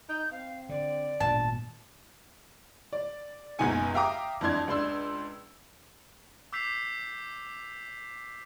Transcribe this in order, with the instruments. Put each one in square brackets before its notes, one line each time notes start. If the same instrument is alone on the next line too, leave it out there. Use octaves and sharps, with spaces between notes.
[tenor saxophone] D#4 [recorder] G6
[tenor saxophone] C4 [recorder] F5
[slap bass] D3 [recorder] D5
[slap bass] G#1 A#2 B3 [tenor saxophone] D4 [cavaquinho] A5
[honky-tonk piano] D5
F#1 C#2 B2 D#4 G#5 C#7
E5 F5 G5 A#5 D6 D#6
F2 E3 D4 C6 G#6
C#2 D4 C6 E6
[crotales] D6 E6 G6 B6 C7 F7